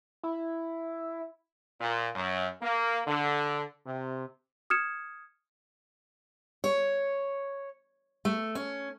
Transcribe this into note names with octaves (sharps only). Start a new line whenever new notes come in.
E4
A#2
F#2
A#3
D3
C3
D#6 F6 G#6 C#7 E7
C#5
A3
C#4